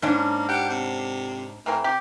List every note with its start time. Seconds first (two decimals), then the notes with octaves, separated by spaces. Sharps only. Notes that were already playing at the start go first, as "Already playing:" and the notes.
0.02 G#2 A#3 C#4 D4
0.49 G4 F#5
0.70 C3
1.66 A2 E3 A#3 C4
1.84 C3 G4